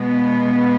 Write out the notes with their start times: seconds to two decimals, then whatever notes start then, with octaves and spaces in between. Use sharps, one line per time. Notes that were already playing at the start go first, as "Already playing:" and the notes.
Already playing: B2 G#3 B3